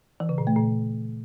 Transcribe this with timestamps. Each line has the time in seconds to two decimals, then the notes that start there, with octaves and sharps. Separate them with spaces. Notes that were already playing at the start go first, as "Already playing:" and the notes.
0.20 E3
0.29 C#3
0.38 A#2
0.47 A3
0.56 A#2